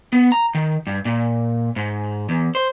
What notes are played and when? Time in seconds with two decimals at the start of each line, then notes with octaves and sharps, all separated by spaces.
0.13 B3
0.32 A#5
0.55 D#3
0.87 G2
1.05 A#2
1.76 G#2
2.29 E2
2.55 C5